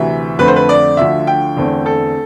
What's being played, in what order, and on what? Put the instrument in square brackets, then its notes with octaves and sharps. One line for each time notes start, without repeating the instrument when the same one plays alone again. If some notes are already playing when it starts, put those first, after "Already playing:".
Already playing: [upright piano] D2 C3 E3 E5
F2 D3 A3 C4 B4
C5
B4
D5
D2 D3 F3 E5
G5
E2 D3 A3 C4
A4